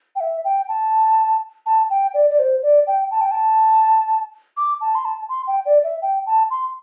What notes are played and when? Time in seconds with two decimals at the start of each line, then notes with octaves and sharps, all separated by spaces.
0.16 G5
0.20 E5
0.44 G5
0.69 A5
1.66 A5
1.90 G5
2.14 D5
2.30 D5
2.39 C5
2.63 D5
2.87 G5
3.11 A5
3.21 G5
3.31 A5
4.57 D6
4.81 A5
4.95 C6
5.05 A5
5.29 C6
5.47 G5
5.66 D5
5.84 E5
6.02 G5
6.26 A5
6.50 C6